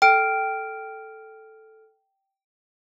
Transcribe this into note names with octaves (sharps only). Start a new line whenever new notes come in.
A4 G5 F6 D7